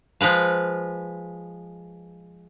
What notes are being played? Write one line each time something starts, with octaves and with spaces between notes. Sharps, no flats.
F3 G#3 B4 F5